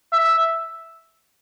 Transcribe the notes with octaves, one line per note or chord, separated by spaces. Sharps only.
E5